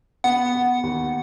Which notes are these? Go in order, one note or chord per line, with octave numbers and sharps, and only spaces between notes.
B3 F#5
B3
D#2